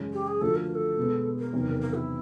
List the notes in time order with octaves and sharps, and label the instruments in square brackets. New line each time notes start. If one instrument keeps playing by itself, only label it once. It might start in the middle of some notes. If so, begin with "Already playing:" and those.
Already playing: [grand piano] F#2 C#3 E3 G#3 C#4
[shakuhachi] G4
G#4
[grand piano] D3 F3 A3 D4 F#4 [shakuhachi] A4
[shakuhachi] A#4
A#4
A4
[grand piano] B2 G#3 B3
[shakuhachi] A#4
[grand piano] E2 C3 D#3 F#3
[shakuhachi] A#4
E4